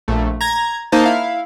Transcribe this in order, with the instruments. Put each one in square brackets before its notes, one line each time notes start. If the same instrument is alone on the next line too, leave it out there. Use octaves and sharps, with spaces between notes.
[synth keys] A#1 A3
A#5 G#6 A#6
A#3 D#4 C5 A5
E4 F5